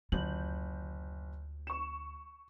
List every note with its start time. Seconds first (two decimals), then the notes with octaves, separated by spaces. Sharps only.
0.12 F#1 D2 F4 G6 F#7
1.67 C#6 E7